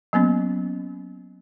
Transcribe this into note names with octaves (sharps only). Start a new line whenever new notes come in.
F#3 A#3 B3 C#4